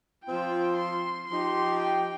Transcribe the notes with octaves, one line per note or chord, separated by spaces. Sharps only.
F3 C4 F4 G5
C6
F3 D#4 G4 C6
G5